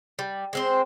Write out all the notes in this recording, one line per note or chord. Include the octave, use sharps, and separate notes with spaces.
G3
G#3 C4 C5